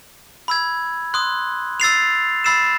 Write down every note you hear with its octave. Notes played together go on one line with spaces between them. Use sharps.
B5 E6 G#6
C6 D#6 F#6
E6 A6 C7 F7
B5 E6 A6 C7 E7